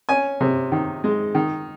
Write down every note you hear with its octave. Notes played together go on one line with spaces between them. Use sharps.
C#4 G#5
C3
D#3
G#3
D#3